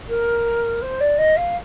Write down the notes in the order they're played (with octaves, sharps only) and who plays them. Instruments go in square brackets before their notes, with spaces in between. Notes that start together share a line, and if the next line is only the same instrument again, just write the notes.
[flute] A#4
C5
D5
D#5
F5